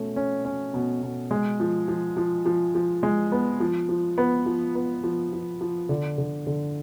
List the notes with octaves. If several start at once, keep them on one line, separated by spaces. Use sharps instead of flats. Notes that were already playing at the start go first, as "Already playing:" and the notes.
Already playing: B2 A3 C#4
C#4
C#4
B2
B2
G#3
F3
F3
F3
F3
F3
G#3
B3
F3
F3
B3
F3
B3
F3
F3
F3
D3
D3
D3